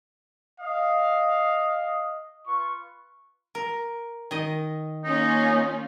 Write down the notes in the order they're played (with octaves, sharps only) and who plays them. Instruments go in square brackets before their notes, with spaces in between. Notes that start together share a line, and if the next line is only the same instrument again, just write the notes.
[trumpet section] D#5 [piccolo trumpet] F5
[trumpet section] F4 B4 C#6
[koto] A#4
D#3 D#5
[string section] A#3 C#4 F4 [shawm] D#4